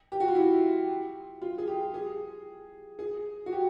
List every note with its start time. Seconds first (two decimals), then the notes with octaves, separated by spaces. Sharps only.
0.12 G4
0.20 F#4
0.28 F4
0.35 E4
1.42 F4
1.58 G#4
1.68 G4
1.94 G#4
2.99 G#4
3.46 F#4
3.53 G4